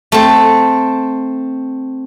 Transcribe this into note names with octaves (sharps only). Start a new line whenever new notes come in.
A3 C4